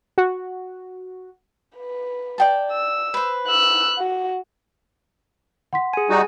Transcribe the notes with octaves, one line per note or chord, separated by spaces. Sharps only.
F#4
B4
D5 G5 A5
E6
B4 C5
E6 F#6
F#4
F#5 C6 B6
G#4 G#5
G3 D#4 F#4